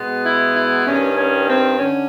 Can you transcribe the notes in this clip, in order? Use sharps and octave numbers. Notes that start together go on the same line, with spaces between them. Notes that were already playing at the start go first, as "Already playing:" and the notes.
Already playing: B2 G#3 B3
E4
E4
G2 D#3 G3 C#4
C#4
C4
D3 C#4